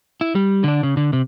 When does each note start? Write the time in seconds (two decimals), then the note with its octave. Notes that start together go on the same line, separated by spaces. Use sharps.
0.21 E4
0.35 G3
0.64 D3 D4
0.83 C#3
0.97 D3
1.13 C3